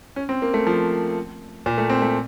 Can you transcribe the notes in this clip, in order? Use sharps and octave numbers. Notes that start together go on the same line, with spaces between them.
C#4
C4
A#3
A3
F3
A#2
A3
C4
A3